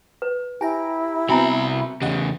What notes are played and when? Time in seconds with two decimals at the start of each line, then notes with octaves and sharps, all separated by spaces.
0.22 B4
0.61 E4 G4 G5 G#5 A#5
1.29 C2 B3 C4 F#4 E5 G#5 A#5 B5
2.02 E2 C#3 G4 D#5 F#5